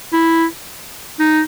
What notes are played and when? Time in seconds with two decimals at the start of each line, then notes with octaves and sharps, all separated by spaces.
0.13 E4
1.20 D#4